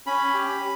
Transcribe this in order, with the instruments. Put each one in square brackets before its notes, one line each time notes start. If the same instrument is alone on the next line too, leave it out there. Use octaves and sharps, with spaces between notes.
[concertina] C#4 B5
G4